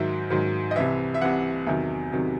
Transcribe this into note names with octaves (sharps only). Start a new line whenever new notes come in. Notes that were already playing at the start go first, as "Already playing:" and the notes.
Already playing: G#2 D#3 F#3 E5
G#2 D#3 F#3
D#5
C2 C3 E3 E5
E5
C2 C3 E3 F#5
E2 C3 D#3 F#3 E5
C3 D#3 F#3